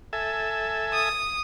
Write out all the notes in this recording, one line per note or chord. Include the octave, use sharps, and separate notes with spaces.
A4 E5 G#5
D#6